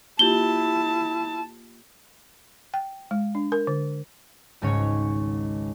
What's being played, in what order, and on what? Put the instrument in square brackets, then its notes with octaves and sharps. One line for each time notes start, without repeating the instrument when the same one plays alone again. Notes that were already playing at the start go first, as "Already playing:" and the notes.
[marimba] A#3 F4 G4 [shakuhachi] E4 [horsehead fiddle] A5 [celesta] G7
[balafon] G5
G#3
D4
A#4
D3
[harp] G#1 C#2 G#2 C#4 C#5 G#6